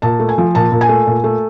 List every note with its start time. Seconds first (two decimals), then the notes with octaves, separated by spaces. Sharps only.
0.02 A#2 A5
0.20 A3
0.29 G#5
0.38 F3
0.55 A#2 A5
0.72 A#2
0.81 G#5
0.89 A3
1.07 A#2
1.24 A3